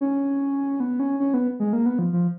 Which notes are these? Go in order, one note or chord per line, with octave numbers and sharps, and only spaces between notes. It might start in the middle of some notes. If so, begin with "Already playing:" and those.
C#4
B3
C#4
C#4
B3
G#3
A#3
B3
F3
F3